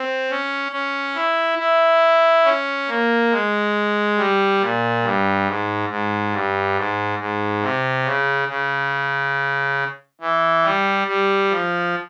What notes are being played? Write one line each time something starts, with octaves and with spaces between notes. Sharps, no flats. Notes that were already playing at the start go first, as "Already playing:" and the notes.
Already playing: C4
C#4
C#4
E4
E4
C#4
A#3
G#3
G3
A#2
G2
G#2
G#2
G2
G#2
G#2
C3
C#3
C#3
E3
G3
G3
F3